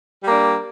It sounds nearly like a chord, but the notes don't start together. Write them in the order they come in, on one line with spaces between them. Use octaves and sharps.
G3 A#3 D4